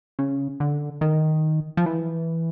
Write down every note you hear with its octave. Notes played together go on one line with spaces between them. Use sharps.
C#3
D3
D#3
F3
E3